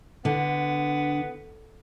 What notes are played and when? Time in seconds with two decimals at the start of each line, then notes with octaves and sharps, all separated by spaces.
0.25 D3 B3